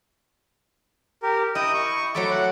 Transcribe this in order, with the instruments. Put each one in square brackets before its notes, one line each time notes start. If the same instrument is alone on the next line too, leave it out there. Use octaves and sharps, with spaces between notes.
[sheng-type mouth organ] G4 A#4
[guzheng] E4 [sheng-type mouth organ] D#5 G5 D#6
[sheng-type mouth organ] C#6
[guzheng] F#3 A3 A4 [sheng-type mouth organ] D6
[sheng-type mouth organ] F#5